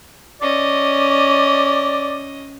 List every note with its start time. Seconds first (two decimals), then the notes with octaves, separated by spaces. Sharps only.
0.42 C#4 D5 D#5